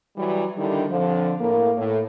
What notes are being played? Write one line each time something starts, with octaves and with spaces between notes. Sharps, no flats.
E3 F#3 G3
D3 D#3 G3 D4 E4
F2 D3 F3
A2 A#3
A2